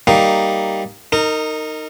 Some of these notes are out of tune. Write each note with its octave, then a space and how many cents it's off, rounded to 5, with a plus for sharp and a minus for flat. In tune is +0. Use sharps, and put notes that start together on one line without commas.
G3 +0 A#3 -5 D#4 +0
D#4 +0 A#4 -25